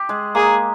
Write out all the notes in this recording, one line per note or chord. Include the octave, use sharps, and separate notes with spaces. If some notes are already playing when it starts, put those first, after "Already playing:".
Already playing: G4
G#3
A#3 G#4